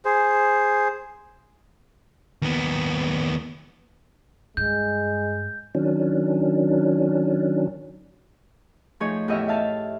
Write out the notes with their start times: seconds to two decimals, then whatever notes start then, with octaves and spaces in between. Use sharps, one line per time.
0.05 G#4 C5
2.42 D#2 B3
4.57 G2 G#3 G6
5.75 D#3 F#3 C#4 D4
9.00 F3 A3 D#4 G#4 C#5
9.28 E2 A2 G4 D#5 E5 F6
9.48 E5 F5 A5